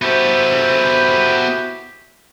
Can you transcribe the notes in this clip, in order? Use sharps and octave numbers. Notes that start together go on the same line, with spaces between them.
B3 E4 F#4 G4 A4 C5